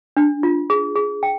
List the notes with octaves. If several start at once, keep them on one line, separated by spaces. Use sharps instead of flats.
D4
F4
G#4
G#4
G5